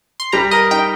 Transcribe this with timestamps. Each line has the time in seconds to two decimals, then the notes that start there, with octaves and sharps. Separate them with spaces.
0.20 C6
0.32 G3 A#5
0.51 A#4 D#5
0.71 D#4 G5